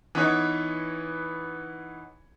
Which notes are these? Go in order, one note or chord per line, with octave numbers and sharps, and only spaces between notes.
E3 B3 D#4 C#5